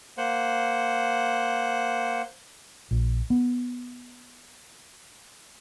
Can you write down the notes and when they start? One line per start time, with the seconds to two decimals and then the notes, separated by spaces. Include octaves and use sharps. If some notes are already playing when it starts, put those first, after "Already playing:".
0.17 A#3 C5 F#5
2.91 A#1
3.30 B3